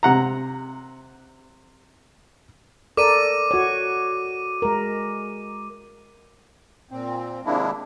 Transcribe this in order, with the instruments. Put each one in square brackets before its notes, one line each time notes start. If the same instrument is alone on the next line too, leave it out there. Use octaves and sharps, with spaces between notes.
[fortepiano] C3 F#5 A#5
[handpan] A4 A#4 D5 [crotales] D6 D#7
[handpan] F#4 C#5
G#3 A#4
[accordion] A#2 C4
C3 D#3 G#3 A#3 D4 E4